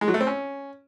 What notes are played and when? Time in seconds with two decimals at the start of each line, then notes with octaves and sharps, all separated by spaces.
0.01 G#3
0.08 F#3
0.14 A3
0.21 C4
0.27 C#4